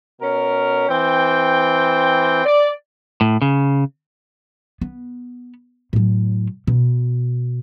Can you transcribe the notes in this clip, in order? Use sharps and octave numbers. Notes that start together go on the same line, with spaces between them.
B2 C#4 A#4
E3 C4 G5
D5
A2
C#3
B3
A2 F#3
B2